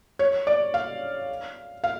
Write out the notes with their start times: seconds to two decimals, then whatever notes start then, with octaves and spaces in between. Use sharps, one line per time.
0.19 C#5
0.47 D5
0.74 F5
1.84 F5